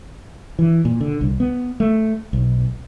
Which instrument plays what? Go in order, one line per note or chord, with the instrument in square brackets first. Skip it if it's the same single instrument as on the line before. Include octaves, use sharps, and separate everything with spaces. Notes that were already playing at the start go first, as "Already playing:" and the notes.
[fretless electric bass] E3
A#2
D3
C2
B3
A3
B1